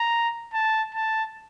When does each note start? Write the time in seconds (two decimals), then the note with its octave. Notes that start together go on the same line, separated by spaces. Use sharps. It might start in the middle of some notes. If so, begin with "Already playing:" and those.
Already playing: A#5
0.54 A5
0.95 A5